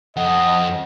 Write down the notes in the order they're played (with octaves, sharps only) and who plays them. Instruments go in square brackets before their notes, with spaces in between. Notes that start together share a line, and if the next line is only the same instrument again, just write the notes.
[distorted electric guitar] F2 [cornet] D#5 [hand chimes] F#5